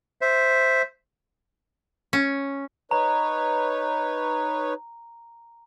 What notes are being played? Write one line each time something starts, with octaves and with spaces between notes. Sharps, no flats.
C5 E5
C#4
D#4 B4 C#5 A#5